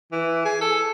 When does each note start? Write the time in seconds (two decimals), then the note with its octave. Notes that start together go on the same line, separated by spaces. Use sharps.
0.12 E3
0.45 G#4
0.61 A4